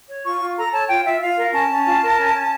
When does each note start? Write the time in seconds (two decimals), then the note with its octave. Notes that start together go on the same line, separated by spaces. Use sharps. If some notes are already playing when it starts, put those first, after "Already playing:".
0.08 C#5
0.24 F4 C#6
0.41 F4
0.57 A4 A#5
0.73 C#5 A5
0.89 F4 G5
1.05 F4 E5
1.21 F4 F5
1.38 A#4
1.53 C#4 A5
1.69 C#4
1.86 F4
2.02 A#4
2.18 C#4
2.34 C#4